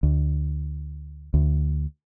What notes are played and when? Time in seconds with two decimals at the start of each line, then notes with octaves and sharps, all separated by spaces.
0.03 D2
1.34 D2